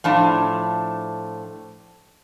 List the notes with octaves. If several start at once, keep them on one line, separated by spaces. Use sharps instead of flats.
A2 F3 D4 A5